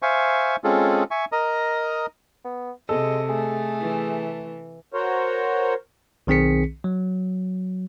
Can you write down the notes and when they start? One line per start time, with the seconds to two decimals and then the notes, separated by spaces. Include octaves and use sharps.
0.02 C5 E5 F5 G#5 C#6
0.64 G#3 C4 C#4 F4 G#4 A4
1.11 E5 G#5 C#6
1.32 A#4 D#5 A#5 D#6
2.45 B3
2.89 C3 G#3 A4 D#5
3.29 A3 G#4
3.80 E3
4.93 F#4 A#4 C5 C#5
6.27 B1 D#3 C4 G#4 B6 C#7
6.84 F#3